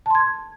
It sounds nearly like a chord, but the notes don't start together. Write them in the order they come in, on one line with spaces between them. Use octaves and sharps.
A5 C6 G#6